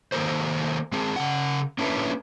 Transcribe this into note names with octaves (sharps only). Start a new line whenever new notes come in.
D#3 A#3 A4 A#4 C5
G#3 C4 G#4
C#3 G#3 F#5
A#3 C#4 D4 E4 A4 B4